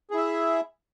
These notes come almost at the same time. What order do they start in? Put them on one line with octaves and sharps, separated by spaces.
G#4 E4 E5